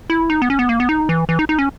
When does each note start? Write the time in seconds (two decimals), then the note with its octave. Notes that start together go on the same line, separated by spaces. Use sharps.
0.10 E4
0.30 D#4
0.42 B3
0.50 C#4
0.59 B3
0.69 A#3
0.80 B3
0.89 D#4
1.09 E3
1.29 E3
1.39 D#4
1.49 D#4
1.59 C#4